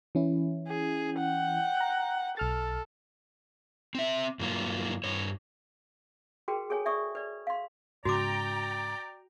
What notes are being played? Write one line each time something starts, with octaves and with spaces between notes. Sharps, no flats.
E3 C#4 E4
G#4
F#5 G5
A#5 F#6
B1 A4 F6 A6
C4 E5
G2 F#3 A#3 F4
G2 C#5
F#4 G#4 A#4 B4 G5
G#4 A4 C#5 G#5
D5 E5 C#6 D#6
B4 D5
F5 C6
G#2 C#3 F#4 D5 G5 A#5 D6